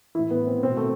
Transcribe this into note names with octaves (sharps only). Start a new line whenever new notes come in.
A2 E3 E4
B3
C4
B2 C4
A3